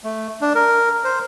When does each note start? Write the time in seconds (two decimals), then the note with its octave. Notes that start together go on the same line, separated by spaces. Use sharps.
0.04 A3
0.41 D4
0.55 A#4
1.04 C5